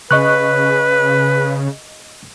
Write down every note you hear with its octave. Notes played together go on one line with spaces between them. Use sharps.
C#3 B4 D#5 C#6 F#6